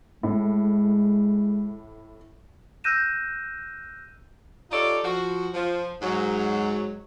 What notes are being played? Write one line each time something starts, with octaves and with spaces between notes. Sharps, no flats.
A2 G#3
E6 F#6 G6 A#6 D#7 E7
D#4 F4 G4 A4 C#5 D5
F3 F#4
F3
G#2 F#3